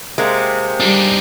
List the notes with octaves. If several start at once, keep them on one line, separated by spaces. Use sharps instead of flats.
C3 G#3 A#3
G3 D4 D#4